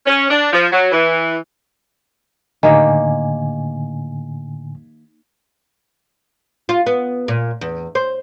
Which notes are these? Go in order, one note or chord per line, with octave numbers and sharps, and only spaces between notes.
C#4
D4
F3
F#3
E3
A2 D3 D#3 A#3 G4 G#5
F4
B3
A#2
E2
C5